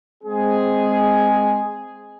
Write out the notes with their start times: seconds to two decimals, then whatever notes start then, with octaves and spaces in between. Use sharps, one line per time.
0.24 G#3 C4 G#4